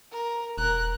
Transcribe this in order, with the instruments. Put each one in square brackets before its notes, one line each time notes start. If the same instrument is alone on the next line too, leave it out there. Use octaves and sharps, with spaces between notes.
[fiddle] A#4
[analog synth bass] E1 [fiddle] A#4 F#6